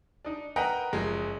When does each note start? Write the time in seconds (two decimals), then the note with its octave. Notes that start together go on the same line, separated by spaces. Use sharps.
0.25 D4 D#4
0.56 A#4 B4 D#5 F#5 G5 A#5
0.93 F#1 F3 G#3 A#6